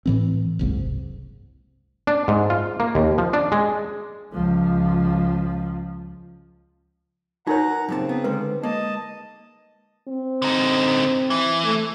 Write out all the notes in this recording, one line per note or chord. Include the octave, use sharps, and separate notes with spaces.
A2 E3 C4
F#1 C2 G#2
D4
G#2
F4
A#3
D#2
F3
D4
G#3
C#2 F3
D#4 F#4 A#4 B4 C#5 F#5 A#5
F#2 A#2 C#3 C4 A5
B3
D3 G#3 B4
G#3 A#3 D#5 A5
C4
D3 D#4
E3
A3